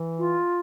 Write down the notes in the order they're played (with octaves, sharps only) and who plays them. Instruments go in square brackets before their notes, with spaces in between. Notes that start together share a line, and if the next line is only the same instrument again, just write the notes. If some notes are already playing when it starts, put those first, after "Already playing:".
Already playing: [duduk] E3
[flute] F4